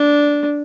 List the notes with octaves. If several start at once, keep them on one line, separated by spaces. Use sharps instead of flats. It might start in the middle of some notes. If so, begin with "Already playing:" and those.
Already playing: D4